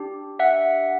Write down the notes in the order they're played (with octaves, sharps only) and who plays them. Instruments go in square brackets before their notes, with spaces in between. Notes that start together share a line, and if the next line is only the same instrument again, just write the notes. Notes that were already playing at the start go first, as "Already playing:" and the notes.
Already playing: [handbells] D4 G4
E5 F#5